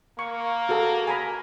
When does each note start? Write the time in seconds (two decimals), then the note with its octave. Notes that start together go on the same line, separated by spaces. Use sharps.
0.19 A#3 C#6
0.69 F#4 G#4 A4
1.07 G#5 A#5 B5